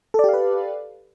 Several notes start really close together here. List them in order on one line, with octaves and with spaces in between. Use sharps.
A4 D5 G4 F5 B4